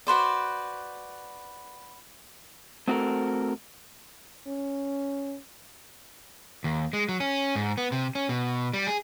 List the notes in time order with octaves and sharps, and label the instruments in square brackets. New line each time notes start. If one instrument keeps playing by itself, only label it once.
[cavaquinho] F#4 B4 C5 D5
[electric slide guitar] A3 C4 F#4 A4 A#4
[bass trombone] C#4
[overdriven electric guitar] D#2
G#3
F#3
C#4
G#2
B3
C3
C#4
B2
G3
G#4